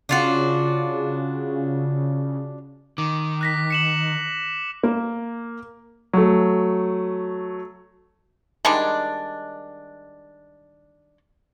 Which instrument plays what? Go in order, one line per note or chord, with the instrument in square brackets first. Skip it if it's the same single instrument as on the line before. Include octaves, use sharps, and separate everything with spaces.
[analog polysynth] C#3 [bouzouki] D4 F4 F#4
[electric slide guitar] D#3 [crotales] D6
[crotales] F#6 A#6 B6
C#7 E7 F#7
[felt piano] A#3
[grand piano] F#3 A3
[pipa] D#3 G3 G#3 D4